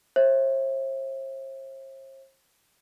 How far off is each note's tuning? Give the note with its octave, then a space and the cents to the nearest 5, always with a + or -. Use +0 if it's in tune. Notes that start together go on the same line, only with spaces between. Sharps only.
C5 +40 E5 +0